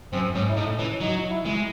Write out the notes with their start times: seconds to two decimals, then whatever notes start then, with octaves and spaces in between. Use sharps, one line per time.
0.12 F#2 C4
0.35 G#2 C#4
0.49 E4
0.56 A2 D#4
0.78 E3 C#4
1.00 F#3 D#4
1.31 E4
1.45 G#3